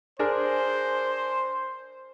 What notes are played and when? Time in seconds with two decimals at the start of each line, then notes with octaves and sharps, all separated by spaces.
0.19 D4 G#4 A#4 C5